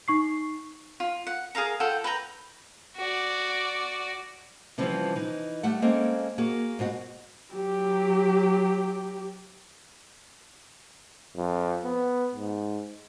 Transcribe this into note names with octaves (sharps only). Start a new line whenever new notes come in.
D#4 C#6 C7
F4
F#5
G#4 A#4 F5 A#5
F4 A4 F#5 G5
B4 G5 A#5
F#4 D5
C3 E3 F3 G3 C4 C#4
E3 D#4
G3 A3 F#5
G#3 A#3 C4 C#4 A4
A#3 F#4 G#4
G#2 B2 F#4
F#3 G4
F2
B3
G#2